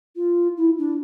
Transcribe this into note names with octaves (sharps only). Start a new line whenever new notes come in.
F4
E4
D4